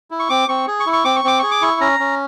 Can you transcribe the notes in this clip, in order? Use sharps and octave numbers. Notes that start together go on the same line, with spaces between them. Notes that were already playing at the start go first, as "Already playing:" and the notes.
E4
C#6
C4 D6
C4 C#6
G#4
C#6
E4
C#6
C4 D6
C#6
C4 D6
G#4 C#6
D6
E4 C#6
C#4 A#5
C#4